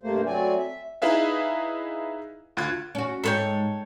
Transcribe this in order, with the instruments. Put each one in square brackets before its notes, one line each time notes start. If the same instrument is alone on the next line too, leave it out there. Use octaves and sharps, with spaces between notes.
[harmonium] G2 C3 A3 A#3 C5
F#3 A3 C4 D5 G#5
E5
[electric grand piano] D#4 E4 G#4 B4 E5 F5
D2 F4 F#6 G#6
[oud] C#4 F#4
[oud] G#2 [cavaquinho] A4 C#5 G5